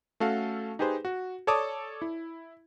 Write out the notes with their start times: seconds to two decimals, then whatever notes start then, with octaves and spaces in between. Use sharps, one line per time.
0.20 A3 C#4 F#4 A4 F5
0.79 D#4 G4 G#4 B4 C5
1.05 F#4
1.47 A4 C#5 D5 A5 D6 D#6
2.02 E4